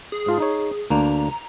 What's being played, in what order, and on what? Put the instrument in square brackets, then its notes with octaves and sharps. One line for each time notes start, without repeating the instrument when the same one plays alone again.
[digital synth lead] G#4
[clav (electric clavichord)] G#2 F4 A5
D#4 C#5
[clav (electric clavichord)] D2 A#3 D4 [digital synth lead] A#5